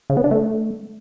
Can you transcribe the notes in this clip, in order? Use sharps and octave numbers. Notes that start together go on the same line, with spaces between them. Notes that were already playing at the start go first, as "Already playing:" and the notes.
C#3
B3
D4
A3